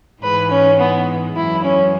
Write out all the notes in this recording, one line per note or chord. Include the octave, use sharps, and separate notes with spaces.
G#2 E3 G#3 B4
C#4
B3
F#2 E3 G#3 E4
C#4